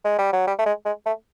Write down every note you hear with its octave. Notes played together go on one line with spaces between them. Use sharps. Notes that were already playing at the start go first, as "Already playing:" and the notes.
G#3
G3
F#3
G3
A3
G#3
G#3
A3